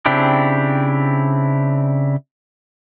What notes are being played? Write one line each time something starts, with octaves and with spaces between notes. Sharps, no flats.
C#3 C4 D4 E4 G4